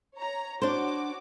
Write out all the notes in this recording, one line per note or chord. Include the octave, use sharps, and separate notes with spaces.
C#5 A#5
D4 F#4 C5 C#5 D6